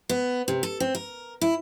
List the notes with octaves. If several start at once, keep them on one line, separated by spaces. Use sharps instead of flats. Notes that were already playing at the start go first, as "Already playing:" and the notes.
B3
C3
A4
C4
A#4
E4